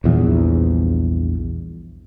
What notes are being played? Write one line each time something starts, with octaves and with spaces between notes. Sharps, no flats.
A#1 E2 G2